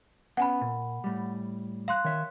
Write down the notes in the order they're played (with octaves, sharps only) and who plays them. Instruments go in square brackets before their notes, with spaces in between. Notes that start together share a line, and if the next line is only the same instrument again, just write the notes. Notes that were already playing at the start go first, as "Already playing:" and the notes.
[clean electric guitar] B3 C#4 [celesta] F#5 G#5 B5
[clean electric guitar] A#2
A2 G3
[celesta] F5 C6 F#6
[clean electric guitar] D#3 C#5 E5